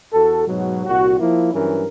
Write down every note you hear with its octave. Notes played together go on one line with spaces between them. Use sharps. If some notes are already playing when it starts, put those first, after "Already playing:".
E2 F#4 A4
G#2 B2 F#3
C2 A#2 F#4
F3 A#3 E4
G2 E3 F#3 C#4 A#4